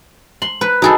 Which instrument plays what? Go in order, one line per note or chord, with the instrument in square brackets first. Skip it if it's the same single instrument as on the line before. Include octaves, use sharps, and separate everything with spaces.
[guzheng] C6 [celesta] F#7
[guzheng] B4
[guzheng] D#4 G#4 A4 [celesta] F#4 B5